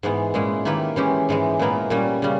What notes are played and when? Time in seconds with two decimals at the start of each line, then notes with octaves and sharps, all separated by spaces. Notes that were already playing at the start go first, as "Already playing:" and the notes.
0.03 G#2 E3 G#3 B3
0.34 A#2 G#3 C#4 E4
0.65 D#3 A#3 E4 G4 B4
0.96 E3 G#3 C#4 G4
1.29 G#2 E3 G#3
1.59 A#2 G#3 B3 E4 A#4
1.90 A#2 G3 C#4
2.22 C#3 G3 C#4